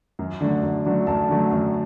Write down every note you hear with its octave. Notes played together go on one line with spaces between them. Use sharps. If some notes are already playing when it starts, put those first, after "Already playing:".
F#2
D3 F#3 A3
F#2
D3 F#3 A3
F#2 A5
D3 F#3 A3
F#2